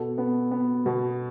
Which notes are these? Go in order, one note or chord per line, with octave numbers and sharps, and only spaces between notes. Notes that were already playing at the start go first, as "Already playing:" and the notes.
Already playing: B2 A4
B3
B3
B2